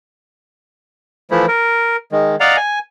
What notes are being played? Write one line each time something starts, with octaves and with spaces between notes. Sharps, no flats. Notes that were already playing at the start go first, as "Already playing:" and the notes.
E3 F3 A3 E4
A#4
D#3 G#3
D5 D#5 F5 F#5 A#5
G#5